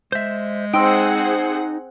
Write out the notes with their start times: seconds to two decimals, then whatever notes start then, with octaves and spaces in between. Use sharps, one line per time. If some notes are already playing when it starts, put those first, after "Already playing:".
0.12 G#3 C5 E5
0.74 C4 D#4 G#4 F#5 G5 C6 E6